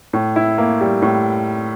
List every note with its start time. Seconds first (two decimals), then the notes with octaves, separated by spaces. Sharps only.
0.13 A2
0.36 E4
0.58 A#3
0.81 G3
1.02 A2